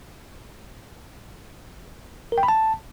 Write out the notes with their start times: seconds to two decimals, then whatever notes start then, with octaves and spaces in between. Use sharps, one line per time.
2.32 A#4
2.38 G5
2.43 B5
2.48 A5